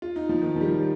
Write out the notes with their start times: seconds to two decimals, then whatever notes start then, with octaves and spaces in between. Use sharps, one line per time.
0.02 F4
0.16 D#4
0.29 F3
0.42 D#3
0.56 F3
0.61 G3